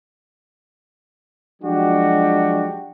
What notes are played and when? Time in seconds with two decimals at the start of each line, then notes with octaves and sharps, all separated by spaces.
1.62 F3 F#3 G#3 D4 F#4 G4